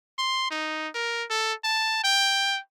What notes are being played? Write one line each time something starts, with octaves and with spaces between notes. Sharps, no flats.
C6
D#4
A#4
A4
A5
G5